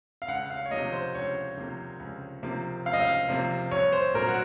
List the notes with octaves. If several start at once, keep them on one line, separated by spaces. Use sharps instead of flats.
F5
C#2 F#5
F5
C#5
C3 F3 A#3 D#5
C5
C#2 C#5
C3 F3 A#3
C#2
C3 F3 A#3
C#2 F5
D#5
F5
C3 F3 A#3
C2 C#5
C5
A#2 F#3 C4 A#4
F#4